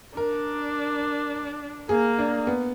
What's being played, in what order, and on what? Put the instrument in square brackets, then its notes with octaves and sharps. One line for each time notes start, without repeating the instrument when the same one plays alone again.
[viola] D4 [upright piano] A#4
[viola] A#3 [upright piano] G#4
[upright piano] D4
B3